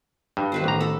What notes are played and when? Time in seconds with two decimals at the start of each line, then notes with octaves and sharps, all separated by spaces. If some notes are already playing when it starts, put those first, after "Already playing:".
0.37 G2
0.52 D#3 B4 C5
0.64 A1 A#5
0.80 A4 B5